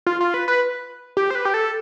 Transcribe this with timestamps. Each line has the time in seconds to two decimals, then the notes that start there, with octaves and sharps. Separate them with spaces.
0.07 F4
0.21 F4
0.34 B4
0.48 B4
1.17 G4
1.31 C5
1.35 B4
1.45 G4
1.54 A4